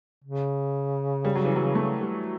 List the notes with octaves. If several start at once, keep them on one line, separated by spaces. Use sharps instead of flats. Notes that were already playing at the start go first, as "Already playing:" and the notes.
C#3
G3
F#3
E3
F#3
A3
G3